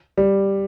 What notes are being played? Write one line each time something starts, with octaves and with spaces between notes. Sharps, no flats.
G3